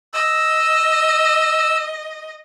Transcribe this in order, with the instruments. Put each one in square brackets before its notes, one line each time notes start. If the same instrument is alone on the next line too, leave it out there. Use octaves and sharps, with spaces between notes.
[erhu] D#5 [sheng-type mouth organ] E6